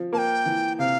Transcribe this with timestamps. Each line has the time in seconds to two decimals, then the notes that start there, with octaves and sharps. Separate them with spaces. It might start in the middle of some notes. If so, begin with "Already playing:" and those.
Already playing: F3
0.13 A#3 A5
0.18 G5
0.46 E3
0.79 C3 F5